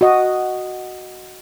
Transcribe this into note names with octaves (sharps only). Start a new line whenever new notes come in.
F#4 D#5